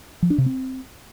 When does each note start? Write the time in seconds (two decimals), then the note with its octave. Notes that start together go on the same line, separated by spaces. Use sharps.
0.22 F3
0.30 D4
0.38 C3
0.46 C4